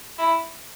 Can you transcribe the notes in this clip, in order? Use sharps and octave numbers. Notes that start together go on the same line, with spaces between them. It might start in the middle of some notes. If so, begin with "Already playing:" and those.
E4